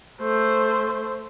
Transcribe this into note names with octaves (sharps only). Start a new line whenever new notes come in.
A3 C5